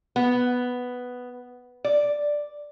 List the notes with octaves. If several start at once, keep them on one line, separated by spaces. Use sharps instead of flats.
B3
D5